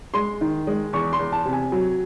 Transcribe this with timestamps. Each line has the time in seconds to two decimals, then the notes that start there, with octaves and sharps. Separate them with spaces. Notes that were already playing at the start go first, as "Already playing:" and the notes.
0.14 G#3 C6
0.41 D#3
0.67 G#3
0.93 E2 C#6
1.13 C6
1.19 E2
1.33 A5
1.45 C3
1.53 G#5
1.72 F#3